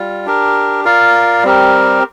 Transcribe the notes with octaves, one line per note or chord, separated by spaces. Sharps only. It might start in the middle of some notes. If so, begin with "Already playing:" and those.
Already playing: G3 F4
D4 G4 A#4
F4 A#4 D5 F5
G3 C4 G4 A#4